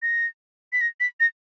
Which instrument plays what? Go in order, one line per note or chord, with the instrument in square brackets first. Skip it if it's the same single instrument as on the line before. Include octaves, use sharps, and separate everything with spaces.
[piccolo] A#6
B6
A#6
B6
A#6